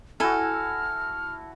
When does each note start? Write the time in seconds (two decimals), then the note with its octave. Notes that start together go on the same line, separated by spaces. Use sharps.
0.20 E4 F#4 A4 G#5 F6